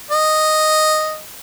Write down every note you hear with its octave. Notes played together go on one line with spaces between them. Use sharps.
D#5